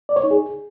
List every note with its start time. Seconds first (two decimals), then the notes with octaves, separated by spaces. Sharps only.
0.09 D5
0.16 C#5
0.24 D#4
0.31 G#4